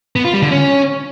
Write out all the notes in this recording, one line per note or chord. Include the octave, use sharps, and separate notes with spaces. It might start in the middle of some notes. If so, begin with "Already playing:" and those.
B3
F4
G3
D3
C#4